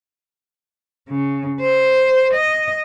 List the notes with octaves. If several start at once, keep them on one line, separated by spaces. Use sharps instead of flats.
C#3
C5
D#5